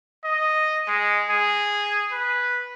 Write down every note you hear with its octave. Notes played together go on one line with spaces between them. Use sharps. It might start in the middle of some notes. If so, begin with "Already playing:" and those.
D#5
G#3
G#4
B4